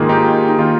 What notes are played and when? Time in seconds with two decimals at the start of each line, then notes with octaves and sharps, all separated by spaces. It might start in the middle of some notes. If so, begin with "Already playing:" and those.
Already playing: G#2 D#3 A#3 F4 G#4
0.09 D#4 G4
0.49 D#4
0.59 D#3 A#3 F4